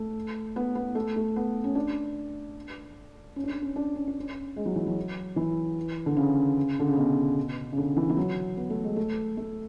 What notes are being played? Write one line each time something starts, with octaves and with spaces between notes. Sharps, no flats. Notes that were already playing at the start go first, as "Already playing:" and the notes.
Already playing: A3
B3
B3
A3
A3
B3
C#4
D4
C#4
D4
C#4
C#4
D4
C#4
D4
C#4
G#3
F#3
E3
F#3
E3
D3
C#3
D3
C#3
B2
C#3
D3
E3
E3
F#3
B3
A3
G#3
A3
A3